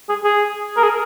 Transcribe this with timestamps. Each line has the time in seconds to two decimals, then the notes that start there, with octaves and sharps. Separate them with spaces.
0.09 G#4
0.24 G#4
0.77 A#4
0.83 G#4